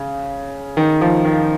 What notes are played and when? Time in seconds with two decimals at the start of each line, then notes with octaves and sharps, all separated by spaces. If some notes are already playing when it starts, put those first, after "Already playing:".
Already playing: C#3
0.77 D#3
1.01 F3
1.24 D#3